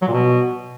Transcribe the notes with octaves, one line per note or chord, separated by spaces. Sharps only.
F#3
A#2
B2